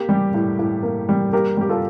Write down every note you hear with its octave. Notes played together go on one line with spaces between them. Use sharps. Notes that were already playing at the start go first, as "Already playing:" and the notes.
Already playing: A#3 G4
G3
A2
A2
A#3
G3
A#3 G4 A#4
G3 G4
F4 A4